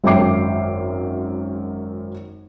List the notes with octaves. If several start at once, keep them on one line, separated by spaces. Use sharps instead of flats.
G#1 F#2 E5 G5 D6 C7